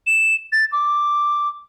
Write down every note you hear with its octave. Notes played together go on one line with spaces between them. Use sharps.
E7
A6
D6